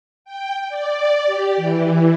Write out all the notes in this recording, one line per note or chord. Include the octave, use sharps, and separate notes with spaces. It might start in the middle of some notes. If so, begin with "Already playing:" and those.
G5
D5
G4
E3